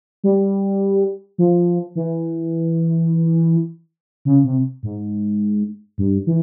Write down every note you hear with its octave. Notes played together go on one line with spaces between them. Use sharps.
G3
F3
E3
C#3
C3
G#2
G2
E3